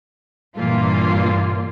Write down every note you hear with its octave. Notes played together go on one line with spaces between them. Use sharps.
G2 A#2 E3 A#3 F4